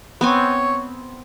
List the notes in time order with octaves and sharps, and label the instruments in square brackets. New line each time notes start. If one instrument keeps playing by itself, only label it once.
[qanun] B3 C4 G#5 [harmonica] C#5